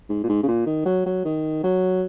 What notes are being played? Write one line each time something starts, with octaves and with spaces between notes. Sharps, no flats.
G#2
A#2
G#2
C#3
A#2
D#3
F#3
F#3
D#3
F#3